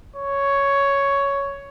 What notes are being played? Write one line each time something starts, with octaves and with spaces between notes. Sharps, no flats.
C#5